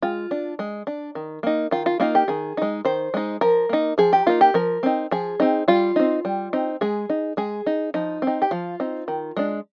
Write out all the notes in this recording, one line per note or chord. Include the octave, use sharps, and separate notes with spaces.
G#3 F4
D4
G#3
D4
D#3
A#3 D#4
D#3 F4
F4
A#3 D#4 F4
G4
D#3 G#4
G#3 D#4
D#3 C5
G#3 D#4
F3 A#4
A#3 D#4
F3 G#4
G4
A#3 D#4 F4
G4
F3 A#4
C4 D#4
F3 G#4
C4 D#4
G3 F4
C4 D#4
G3
C4 D#4
G#3 G#4
D#4
G#3 G#4
D#4
F3 D#4
C4
D#4
G4
F3 F4
C4 D#4
D#3
G#3 D4